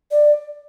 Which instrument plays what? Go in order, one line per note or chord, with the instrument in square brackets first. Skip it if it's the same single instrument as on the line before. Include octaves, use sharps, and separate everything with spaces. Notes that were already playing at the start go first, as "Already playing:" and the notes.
[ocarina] D5